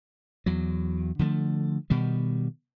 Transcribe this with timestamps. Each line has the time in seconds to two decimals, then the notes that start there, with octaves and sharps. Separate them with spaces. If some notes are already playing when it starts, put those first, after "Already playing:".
0.46 E2 F#3
1.19 D3 F3 G3 A3
1.90 B2 D#3 G3